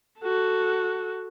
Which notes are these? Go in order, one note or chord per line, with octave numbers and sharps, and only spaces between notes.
F#4 A4